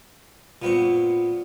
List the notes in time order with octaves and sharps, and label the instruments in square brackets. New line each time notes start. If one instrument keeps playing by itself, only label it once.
[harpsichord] A#2 B3 C4 C#6